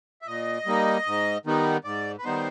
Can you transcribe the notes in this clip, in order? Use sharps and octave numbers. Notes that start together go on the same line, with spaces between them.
E5
A#2 D#5
G3 A#3 D#4
G#2
D#3 G3 B3 D#4
G#2 D5
B4
D#3 G3 B3 D#4 C5